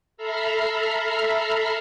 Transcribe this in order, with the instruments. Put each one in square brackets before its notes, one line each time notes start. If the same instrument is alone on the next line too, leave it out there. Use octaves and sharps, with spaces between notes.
[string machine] A4 E5 A#5 B5 F6 C7